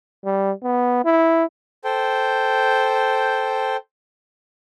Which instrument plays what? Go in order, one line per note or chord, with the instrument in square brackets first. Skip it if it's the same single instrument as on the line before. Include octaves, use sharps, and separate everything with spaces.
[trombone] G3
B3
E4
[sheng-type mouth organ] A4 C5 G5